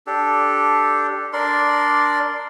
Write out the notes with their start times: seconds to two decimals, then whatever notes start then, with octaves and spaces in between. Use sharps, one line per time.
0.07 D4 G4 A4
1.33 D4 A#4 D5 C6